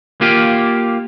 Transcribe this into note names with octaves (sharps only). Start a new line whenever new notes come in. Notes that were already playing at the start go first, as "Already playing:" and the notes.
A#3 F4 G4